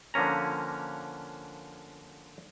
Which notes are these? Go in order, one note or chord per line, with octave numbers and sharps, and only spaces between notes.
D3 F3 A#3 C#4 A#5